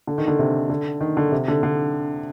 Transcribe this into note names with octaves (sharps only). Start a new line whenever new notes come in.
D3
D#3
D3
C3
D3
D#3
D3
C3
D3
D3